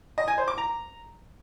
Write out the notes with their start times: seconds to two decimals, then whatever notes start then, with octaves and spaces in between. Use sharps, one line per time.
0.18 D#5
0.28 G#5
0.38 C5
0.48 D6
0.58 A#5